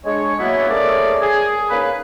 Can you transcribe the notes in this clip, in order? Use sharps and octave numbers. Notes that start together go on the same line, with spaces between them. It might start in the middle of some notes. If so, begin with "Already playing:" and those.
G#3 D4 C#5
F#3 A#3 B3 E4
A3 C#4 G#4 A#4 D5
G#4
A#3 C#4 D#4 G#4 B4